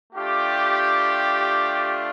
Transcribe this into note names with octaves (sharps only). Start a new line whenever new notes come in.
A3 D4 F4 G4